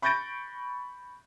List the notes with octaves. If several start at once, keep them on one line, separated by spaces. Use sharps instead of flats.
B5 C#6 G6 A6 A#6 D7